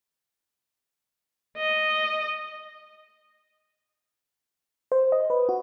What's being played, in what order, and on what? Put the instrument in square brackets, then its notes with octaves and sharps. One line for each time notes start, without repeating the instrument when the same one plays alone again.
[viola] D#5
[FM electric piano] C5
D#5
B4
F#4